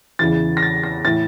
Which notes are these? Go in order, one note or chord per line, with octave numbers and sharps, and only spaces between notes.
E2 C#3 E3 A6
A#6
A6
A#6
A2 E3 A6